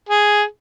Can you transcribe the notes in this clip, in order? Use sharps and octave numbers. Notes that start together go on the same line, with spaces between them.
G#4